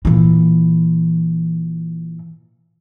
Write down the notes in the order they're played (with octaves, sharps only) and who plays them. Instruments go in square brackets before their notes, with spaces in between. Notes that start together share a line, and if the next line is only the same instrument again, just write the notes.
[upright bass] A#2 E3